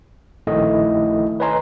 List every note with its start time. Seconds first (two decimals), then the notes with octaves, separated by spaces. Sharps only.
0.47 A#1 D#3 A3 E4 A4 D#5
1.40 B4 C#5 D#5 G#5 A#5 C6